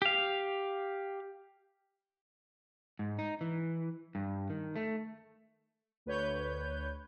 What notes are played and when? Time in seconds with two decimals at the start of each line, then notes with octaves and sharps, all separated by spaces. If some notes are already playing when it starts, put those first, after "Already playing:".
0.02 G4 F5
2.99 G#2
3.19 D#4
3.41 E3
4.15 G2
4.50 D#3
4.76 A3
6.06 D2 B4 C#5 G6